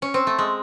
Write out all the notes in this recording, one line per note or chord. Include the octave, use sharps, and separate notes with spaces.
C#4
C4
A3
G#3